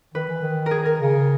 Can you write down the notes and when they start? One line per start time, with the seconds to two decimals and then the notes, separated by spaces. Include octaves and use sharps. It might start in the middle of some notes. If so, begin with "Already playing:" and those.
0.14 D#3 B4
0.28 E3
0.43 D#3
0.66 A#4
0.71 G#4
0.85 A#4
1.00 C#3